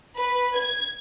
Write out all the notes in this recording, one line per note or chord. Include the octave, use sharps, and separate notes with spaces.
B4
G#6